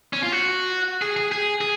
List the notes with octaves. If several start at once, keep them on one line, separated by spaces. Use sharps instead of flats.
C#4
F4
F#4
G#4
G#4
G#4
G#4